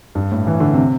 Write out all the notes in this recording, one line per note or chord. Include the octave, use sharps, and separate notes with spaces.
G2
A2
E3
D3
C3